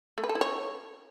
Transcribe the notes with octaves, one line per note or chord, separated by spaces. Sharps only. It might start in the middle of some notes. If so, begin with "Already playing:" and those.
A3
B4
A4
E4
C#5